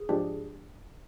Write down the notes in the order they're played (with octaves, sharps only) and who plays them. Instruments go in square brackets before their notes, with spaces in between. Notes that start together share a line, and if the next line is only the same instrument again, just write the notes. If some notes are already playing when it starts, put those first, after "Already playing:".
Already playing: [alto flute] G#4
[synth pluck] G#2 F3 G#3 D4 G4